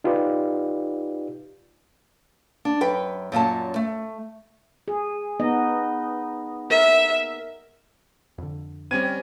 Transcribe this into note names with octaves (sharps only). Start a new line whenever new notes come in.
D#4 F4 G4 B4 D5
D4
F#2 B4 G5
F#2 A#2 C#4 A5
A3
G#4
B3 D#4 D#5
A#4 E5
F2 D3
G3 C4 C#4 G#6 D#7